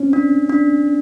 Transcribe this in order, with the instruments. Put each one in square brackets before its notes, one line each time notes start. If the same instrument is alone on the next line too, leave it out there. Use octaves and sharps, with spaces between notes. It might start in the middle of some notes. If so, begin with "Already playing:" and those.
Already playing: [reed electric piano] C4 C#4
[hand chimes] D4
D4